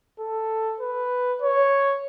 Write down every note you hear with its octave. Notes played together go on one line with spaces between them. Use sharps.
A4
B4
C#5